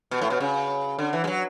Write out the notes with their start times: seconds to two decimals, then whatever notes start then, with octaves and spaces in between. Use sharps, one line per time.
0.11 B2
0.22 A2
0.30 B2
0.40 C#3
0.99 D3
1.13 E3
1.24 G#3
1.27 F#3